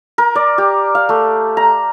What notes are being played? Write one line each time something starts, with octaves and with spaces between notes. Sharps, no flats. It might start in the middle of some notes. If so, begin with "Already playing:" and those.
A#4
D5
G4
F5
A3
A#5